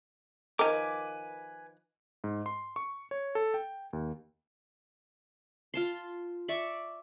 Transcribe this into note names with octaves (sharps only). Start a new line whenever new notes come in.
D#3 F3 A#4 B4 G#5 D6
G#2
C6
C#6
C#5
A4
G5
D#2
F4 A5 C6
D5 E5 C#6